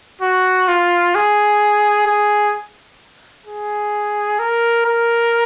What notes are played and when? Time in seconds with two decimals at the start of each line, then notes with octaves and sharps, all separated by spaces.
0.21 F#4
0.68 F4
1.15 G#4
2.07 G#4
3.46 G#4
4.39 A#4
4.86 A#4